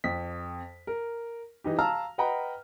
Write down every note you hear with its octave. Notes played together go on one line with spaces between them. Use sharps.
F2 B6
A#4
E3 D#4 G4
F5 A5 A#5 E6 F6
B4 D#5 F#5 G5 A#5 B5